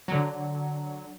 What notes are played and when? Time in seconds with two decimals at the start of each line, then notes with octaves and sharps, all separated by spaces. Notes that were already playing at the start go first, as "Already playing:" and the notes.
0.08 D3 F#3